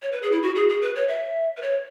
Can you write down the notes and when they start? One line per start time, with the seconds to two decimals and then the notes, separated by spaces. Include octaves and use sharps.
0.02 C#5
0.12 B4
0.22 G#4
0.32 E4
0.43 F#4
0.55 G#4
0.69 G#4
0.82 B4
0.96 C#5
1.08 E5
1.57 B4
1.62 C#5